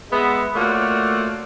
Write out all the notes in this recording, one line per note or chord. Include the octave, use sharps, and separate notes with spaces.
G#3 B3 E5
A3 A#3 F4 F#4 C#5 D5